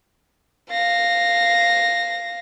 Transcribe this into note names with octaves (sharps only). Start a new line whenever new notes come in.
F5 A#6